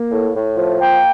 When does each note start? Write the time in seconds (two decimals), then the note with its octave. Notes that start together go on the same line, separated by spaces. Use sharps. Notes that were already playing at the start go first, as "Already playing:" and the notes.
Already playing: A#3
0.11 A2
0.34 A2
0.56 F3
0.78 A#3 G5